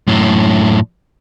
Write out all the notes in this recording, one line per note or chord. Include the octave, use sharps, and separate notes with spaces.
F#2 A2